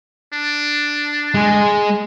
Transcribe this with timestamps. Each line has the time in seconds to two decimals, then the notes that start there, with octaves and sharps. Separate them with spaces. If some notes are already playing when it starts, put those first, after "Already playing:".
0.33 D4
1.34 G#3 G#4